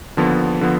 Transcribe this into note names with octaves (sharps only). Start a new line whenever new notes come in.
D#2 D3 F3 B3
D3 F3 B3